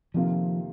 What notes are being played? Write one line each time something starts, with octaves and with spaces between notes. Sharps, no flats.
F2 C3 D#3 F3 A#3 F4